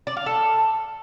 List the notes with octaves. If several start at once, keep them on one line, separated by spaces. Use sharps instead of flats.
D5
F5
A4